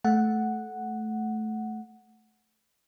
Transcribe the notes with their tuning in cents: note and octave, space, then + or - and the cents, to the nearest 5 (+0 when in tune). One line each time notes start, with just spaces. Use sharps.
A3 -15 F#5 +0